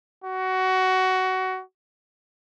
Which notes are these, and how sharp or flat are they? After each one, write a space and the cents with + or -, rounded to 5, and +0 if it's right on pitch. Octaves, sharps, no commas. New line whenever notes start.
F#4 +20